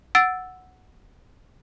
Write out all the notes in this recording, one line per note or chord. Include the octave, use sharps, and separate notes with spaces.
F#5 E6 A6 D7